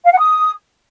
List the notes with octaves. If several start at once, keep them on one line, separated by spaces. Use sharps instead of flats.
F5
F#5
D#6